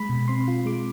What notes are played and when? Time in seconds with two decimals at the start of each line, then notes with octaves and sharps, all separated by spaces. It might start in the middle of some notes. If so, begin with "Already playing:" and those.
Already playing: G#3 B5
0.09 B2
0.28 C4 C6
0.48 F4
0.66 G#3 D6